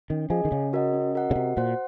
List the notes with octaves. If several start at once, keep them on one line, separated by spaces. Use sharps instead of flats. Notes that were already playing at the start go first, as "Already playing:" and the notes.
D#3 C#4
F3 G#4 D#5 G#5
D#3
C#3 C#4
F#4 A#4 D#5 F#5
C#4
F#4 A#4 D#5 F#5
C#3
C3 F#4
A#2 C5 F#5